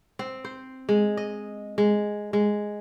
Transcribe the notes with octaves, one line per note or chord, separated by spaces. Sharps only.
C4
C5
G#3
D#5
G#3
G#3